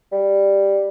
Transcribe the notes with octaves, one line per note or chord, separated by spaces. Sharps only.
G3